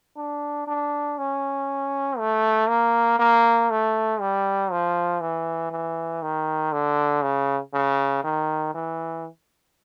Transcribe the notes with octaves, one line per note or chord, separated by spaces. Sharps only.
D4
D4
C#4
A3
A#3
A#3
A3
G3
F3
E3
E3
D#3
D3
C#3
C#3
D#3
E3